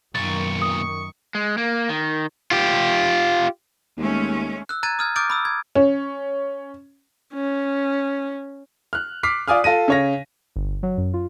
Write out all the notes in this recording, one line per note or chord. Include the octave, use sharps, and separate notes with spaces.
B1 F#2 A#2 D#3 C#6 A6
D#6
G#3
A#3
D#3
F4 G4
D#2 G#3 A3 C#4
E6 F#6
A#5 F#6 G#6 A6 D#7
D#6 F6 G#6
D6 D#6 F6 G6 A6 D7
B5 D#6 E6
G#6
C#4
C#4
F6 F#6
D6 F6 B6 C7
F4 D5 G#5 D#6 F6
F4 A4 A#6 D#7
C#3 C#5 A#6
G1
F#3
F#2
F4